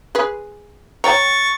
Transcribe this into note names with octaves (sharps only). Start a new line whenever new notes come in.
G#4 B4
C#5 G5 A#5 C#6 A6